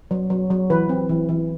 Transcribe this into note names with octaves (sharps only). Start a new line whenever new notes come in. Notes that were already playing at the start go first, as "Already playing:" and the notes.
F#3
F#3
F#3
E3 B4
C4
E3
E3